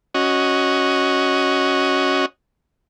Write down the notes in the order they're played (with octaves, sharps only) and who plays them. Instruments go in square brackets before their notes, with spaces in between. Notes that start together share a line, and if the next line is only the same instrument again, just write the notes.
[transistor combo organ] C#4 F#4 D#5